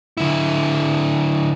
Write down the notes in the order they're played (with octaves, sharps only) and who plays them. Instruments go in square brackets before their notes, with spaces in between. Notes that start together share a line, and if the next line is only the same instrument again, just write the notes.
[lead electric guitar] D3 E4